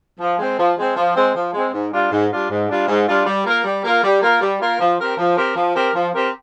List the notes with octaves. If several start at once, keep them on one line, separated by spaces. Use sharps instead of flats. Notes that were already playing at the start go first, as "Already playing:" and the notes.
F3
G#3 C4
F3
G#3 C4
F3
G#3 C4
F3
G#3 C4
G#2
G3 D4 F4
G#2
G3 D4 F4
G#2
G3 D4 F4
G#2
G3 D4 F4
G3
A#3 F4 A#4
G3
A#3 F4 A#4
G3
A#3 F4 A#4
G3
A#3 F4 A#4
F3
C4 G4 A#4
F3
C4 G4 A#4
F3
C4 G4 A#4
F3
C4 G4 A#4